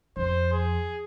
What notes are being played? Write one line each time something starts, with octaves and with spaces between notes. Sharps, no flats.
F2 C5
G#4